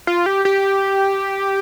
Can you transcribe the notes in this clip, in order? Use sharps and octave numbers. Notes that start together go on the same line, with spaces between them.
F4
G4
G4